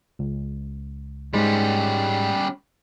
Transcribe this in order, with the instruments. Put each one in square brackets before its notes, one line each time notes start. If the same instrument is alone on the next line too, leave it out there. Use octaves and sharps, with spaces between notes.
[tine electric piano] C#2
[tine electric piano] G#2 G#3 [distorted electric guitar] G3 C#4